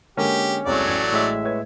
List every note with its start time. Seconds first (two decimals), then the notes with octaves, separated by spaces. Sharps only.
0.17 D3 G#3 A#3 C#4 G4
0.65 E1 C2 F#3 A3 C#5 D5
0.87 A1 G#6
1.12 A2 G#3 E5
1.44 B4 C#5 G#6